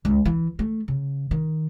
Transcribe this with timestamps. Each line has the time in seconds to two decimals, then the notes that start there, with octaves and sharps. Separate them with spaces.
0.05 C#2
0.25 E3
0.59 A3
0.88 C#3
1.31 D#3